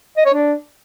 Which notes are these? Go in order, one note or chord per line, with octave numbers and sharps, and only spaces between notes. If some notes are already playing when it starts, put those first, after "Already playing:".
D#5
C#5
D4